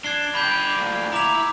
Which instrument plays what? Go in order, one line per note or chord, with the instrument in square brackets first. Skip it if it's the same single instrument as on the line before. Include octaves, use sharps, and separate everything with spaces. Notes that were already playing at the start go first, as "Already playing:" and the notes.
[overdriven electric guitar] D4 [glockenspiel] G#6 C7 G7
[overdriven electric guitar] D3 G4 [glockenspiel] B5 G6
[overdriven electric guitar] D2 A#2
[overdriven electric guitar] E4 E5 [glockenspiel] A#5 D6 F7